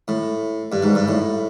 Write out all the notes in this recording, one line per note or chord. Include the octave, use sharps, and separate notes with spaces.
A2
G2
G#2
G2
A2